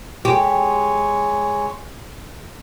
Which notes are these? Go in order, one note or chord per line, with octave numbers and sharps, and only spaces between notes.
G#3 G4 C#5